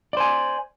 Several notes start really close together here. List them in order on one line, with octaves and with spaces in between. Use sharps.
D5 C5 G#5